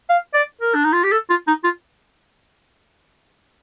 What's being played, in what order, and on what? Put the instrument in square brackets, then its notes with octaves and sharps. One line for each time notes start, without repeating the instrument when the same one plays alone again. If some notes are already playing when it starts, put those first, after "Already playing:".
[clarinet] F5
D5
A#4
D4
D#4
F4
G4
A4
F4
D#4
F4